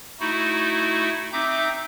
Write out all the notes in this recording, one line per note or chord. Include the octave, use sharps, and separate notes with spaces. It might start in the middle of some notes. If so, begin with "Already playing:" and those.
A3 D#4 E4 F#4
C4 D#4 E5 D6 G6